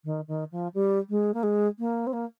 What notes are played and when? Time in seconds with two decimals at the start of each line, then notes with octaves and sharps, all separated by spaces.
0.05 D#3
0.28 D#3
0.52 F3
0.74 G3
1.10 G#3
1.34 A#3
1.43 G#3
1.79 A#3
2.07 C4
2.13 A#3